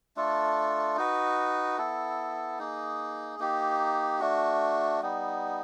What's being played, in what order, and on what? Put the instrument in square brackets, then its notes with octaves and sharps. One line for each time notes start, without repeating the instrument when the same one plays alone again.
[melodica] A3 D4 F4 A4
D#4 F#4 B4
B3 E4 A4
A#3 D#4 G#4
A#3 D#4 G4
A3 D4 F#4
G3 B3 D#4